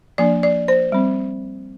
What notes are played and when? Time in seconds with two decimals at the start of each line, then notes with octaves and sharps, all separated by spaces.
0.18 F3 A#3 D4 D5
0.43 D5
0.68 C5
0.92 G3 C4